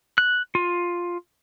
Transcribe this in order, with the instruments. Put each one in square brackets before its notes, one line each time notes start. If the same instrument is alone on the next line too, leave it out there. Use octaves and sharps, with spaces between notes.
[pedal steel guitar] F#6
F4